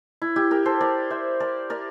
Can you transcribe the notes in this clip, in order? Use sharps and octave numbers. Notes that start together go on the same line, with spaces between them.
E4
E4 G4
G4 A#4
A4 C5
A#4 D5
C5 E5
A#4 D5
A#4 D5